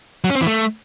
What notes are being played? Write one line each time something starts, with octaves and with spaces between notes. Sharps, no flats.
F#3
C#4
C4
E3
A3